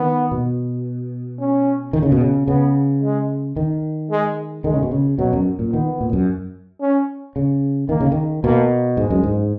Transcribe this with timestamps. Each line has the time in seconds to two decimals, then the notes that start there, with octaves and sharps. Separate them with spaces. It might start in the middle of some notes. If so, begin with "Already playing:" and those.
Already playing: D#3 B3
0.32 B2
1.39 C#4
1.93 D#3
2.02 C#3
2.12 B2
2.21 C#3
2.48 C#3 B3
3.03 G#3
3.56 D#3
4.11 G#3
4.64 D#3 G#3
4.74 C#3
4.83 B2
4.91 C#3
5.18 B2 F#3
5.33 F#2
5.59 A#2
5.72 D#3 B3
6.01 A#2
6.13 F#2
6.81 C#4
7.36 C#3
7.89 D#3 A#3
8.01 C#3
8.12 D#3
8.44 B2 A#3
8.97 G#2 G#3
9.10 F#2
9.24 G#2